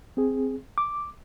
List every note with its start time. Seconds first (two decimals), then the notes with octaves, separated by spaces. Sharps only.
0.17 C4 G#4
0.78 D6